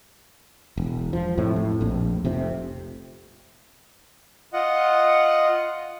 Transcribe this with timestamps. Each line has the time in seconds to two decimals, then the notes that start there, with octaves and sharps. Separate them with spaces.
0.78 E1
1.13 F3
1.37 F2 A2 C3
1.56 A2
1.81 A#1 F2
2.25 F1 F2 C3
4.53 F4 D#5 F#5